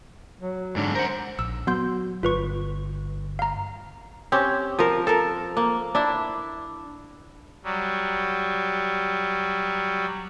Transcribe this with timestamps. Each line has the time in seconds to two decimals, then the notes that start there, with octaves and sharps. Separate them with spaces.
0.40 F#3
0.76 G#2 D3 D4
0.95 A#4 C5 F#5
1.39 A#1 E6
1.67 F#3 B3 C6 G6
2.23 G1 F4 B4 C#6
3.39 F5 A#5
4.32 C4 C#4 G4
4.79 F3 A#4
5.07 A4 A#4
5.57 A#3
5.95 D4 E4
7.64 F#3 G3